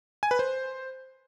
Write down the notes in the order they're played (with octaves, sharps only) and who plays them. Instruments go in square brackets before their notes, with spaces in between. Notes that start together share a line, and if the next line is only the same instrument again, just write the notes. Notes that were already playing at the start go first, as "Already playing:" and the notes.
[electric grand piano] G#5
B4
C5